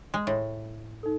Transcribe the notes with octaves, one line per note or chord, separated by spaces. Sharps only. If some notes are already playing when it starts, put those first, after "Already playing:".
G#3
A2
D#4 A4